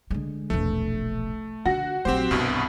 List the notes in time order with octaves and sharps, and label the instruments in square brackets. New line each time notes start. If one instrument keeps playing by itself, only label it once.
[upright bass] D3 G#3
[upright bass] E1 A#1 [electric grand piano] A3
[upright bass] D3 [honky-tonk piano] F#4 F#5 A#6
[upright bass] A#1 F#3 [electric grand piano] C4 G4 C5
[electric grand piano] C2 G2 B2 [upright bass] C4